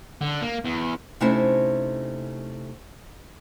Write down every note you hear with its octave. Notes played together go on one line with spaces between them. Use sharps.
D3
A#3
E2
C3 A3 C#4 D#4 E4 C5